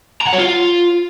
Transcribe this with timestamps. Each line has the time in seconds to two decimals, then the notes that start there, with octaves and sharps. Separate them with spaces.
0.22 A#5
0.27 F#5
0.33 C#5
0.39 F4